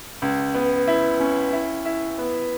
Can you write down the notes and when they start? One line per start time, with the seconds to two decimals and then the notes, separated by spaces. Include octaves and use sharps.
0.22 C#2
0.55 B3
0.87 E4
1.20 C#4
1.53 E4
1.85 E4
2.18 B3